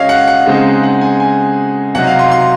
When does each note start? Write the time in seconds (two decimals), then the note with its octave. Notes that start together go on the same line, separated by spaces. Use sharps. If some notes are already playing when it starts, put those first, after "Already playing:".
Already playing: C#3 G#3 C#5 D#5 F5
0.09 F#5
0.27 F#5
0.46 C#3 G#3 C4 D#4
0.83 F#5
1.01 G#5
1.20 G#5
1.94 C3 F#3 C4 D#4 F#5
2.07 F5
2.19 C6
2.31 C6